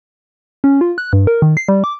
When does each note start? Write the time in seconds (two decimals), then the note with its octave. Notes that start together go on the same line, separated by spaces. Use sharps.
0.64 C#4
0.81 F4
0.98 F#6
1.13 G2
1.27 A#4
1.42 D#3
1.57 C7
1.69 G3
1.84 D6